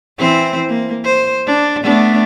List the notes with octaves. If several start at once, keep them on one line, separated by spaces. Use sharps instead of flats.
E3 C4 C5
A#3
C5
D4
A3 B3 D4